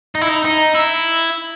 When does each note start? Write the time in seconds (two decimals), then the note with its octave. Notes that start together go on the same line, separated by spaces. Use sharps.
0.15 D#4
0.21 E4
0.29 D#4
0.45 D#4
0.75 E4